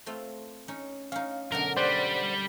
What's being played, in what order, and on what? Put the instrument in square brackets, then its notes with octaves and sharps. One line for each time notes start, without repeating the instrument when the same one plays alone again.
[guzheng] A3 C4 F4
C#4 D#4
[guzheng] C#4 D#4 [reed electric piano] F5
[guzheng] F#2 B2 D3 [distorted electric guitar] A#4
[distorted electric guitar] G3 [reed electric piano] C5 D5 F#5